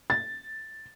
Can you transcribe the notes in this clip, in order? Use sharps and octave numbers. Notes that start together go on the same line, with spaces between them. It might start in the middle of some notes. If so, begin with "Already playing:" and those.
A6